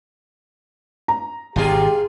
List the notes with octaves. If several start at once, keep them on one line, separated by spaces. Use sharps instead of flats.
A#5
G#1 G#2 B2 F4 G4 G#4